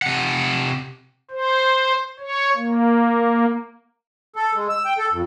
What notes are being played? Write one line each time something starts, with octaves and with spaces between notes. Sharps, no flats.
C3 F#5
C5
C#5
A#3
A4
G#3
E6
G5
A4
F2